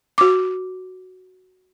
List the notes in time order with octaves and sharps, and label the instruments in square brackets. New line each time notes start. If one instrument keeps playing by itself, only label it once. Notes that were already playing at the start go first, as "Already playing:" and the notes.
[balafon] F#4 D6